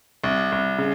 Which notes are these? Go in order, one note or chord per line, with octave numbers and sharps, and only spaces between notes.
C2
C2
C#3